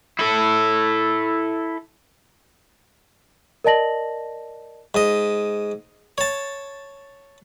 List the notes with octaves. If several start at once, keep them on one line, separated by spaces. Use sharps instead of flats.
E4 A4
A#4 D5 D#5 A5 A#6 F#7
G#2 D#5
C#5 A5